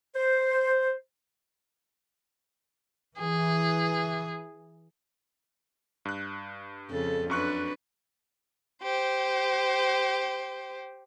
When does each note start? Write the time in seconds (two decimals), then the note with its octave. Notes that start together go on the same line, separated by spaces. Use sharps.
0.15 C5
3.19 E3 G#4
6.05 G2 F#6
6.90 F2 C#3 A4
7.30 F#2 D4 B4 C#6 F#6
8.83 G4 C5